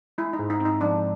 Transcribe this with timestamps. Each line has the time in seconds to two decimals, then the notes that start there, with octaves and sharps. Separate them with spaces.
0.18 G#3 E4
0.33 D#4
0.39 G#2
0.50 D#4
0.60 C4
0.65 D#4
0.81 F3 D4